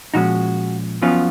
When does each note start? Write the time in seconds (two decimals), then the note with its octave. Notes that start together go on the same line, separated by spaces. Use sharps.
0.14 A#2 F3 G#3 C#4 D#4 F#4
1.02 F#2 F3 B3 C#4 F4